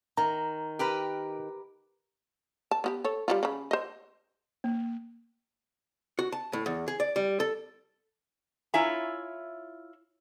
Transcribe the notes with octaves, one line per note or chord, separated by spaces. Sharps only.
D#3 A#5
G4 A#4 B4
A5
B3 F#4 G4
A4 C#5
G3 E4 F4
C#3 B5
C5 D#5
A#3
F#4
A5
A2
E2
G#4
D5
G3
A4
E4 F4 C#5 E5 G#5 A#5